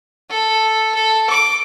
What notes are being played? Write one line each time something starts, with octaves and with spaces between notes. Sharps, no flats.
A4
A4
D6